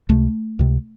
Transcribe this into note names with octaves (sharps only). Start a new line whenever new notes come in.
C#2 C3 A3
C#2 C3